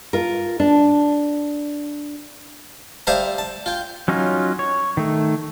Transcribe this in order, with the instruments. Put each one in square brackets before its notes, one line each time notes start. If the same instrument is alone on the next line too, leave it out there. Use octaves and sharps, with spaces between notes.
[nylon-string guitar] F4 A#4
D4
[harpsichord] G3 C5 E5 F5 A5 A#5
A5
F4 G5
[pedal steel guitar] F#3 C#4 D#4 F4
C#5
D#3 A3